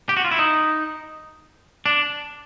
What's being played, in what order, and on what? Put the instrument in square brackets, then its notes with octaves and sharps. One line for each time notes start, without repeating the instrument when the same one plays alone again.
[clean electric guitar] G4
F#4
F4
E4
D#4
D4